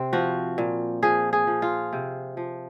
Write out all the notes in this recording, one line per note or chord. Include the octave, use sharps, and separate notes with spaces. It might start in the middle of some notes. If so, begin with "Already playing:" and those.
Already playing: C3 C4
F3 F#4
A#2
F3 G#4
G#4
F3
F4
C3
F3